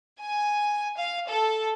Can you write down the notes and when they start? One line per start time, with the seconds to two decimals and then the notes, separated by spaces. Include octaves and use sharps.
0.21 G#5
0.98 F5
1.28 A4